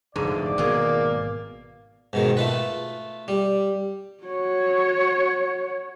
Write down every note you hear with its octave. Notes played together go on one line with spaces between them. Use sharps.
F1 G#2 D3 D5
G#1 B2 A#3 G#4 A#5
G#2 B2 D#3
A3 F4 B4
G3
F#4 C#5